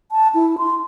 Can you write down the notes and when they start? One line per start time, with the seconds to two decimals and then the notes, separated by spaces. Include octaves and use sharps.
0.11 A5
0.35 E4
0.58 C6